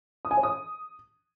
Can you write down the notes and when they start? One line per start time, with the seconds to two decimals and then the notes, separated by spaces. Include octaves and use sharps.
0.25 D#6
0.31 G#5
0.37 C#5
0.43 D#6